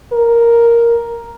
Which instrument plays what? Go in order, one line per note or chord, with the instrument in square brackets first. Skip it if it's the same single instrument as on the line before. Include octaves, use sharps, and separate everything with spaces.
[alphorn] A#4